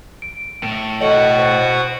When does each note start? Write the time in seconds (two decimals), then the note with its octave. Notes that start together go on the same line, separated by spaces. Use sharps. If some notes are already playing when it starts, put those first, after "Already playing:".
0.22 D7
0.63 A2
1.01 B2 F#4 A4 C#5 D#5 F#5 F#7
1.37 C5